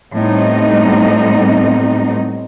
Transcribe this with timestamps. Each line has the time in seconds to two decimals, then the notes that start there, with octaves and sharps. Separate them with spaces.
0.13 A2 G3 B3 C4 D#4